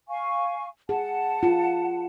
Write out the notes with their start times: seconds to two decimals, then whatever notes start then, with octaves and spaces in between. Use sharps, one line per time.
0.09 F5 G#5 C#6
0.89 G#4 F#5 A5
1.43 F4